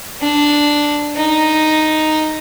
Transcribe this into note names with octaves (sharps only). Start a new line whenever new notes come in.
D4
D#4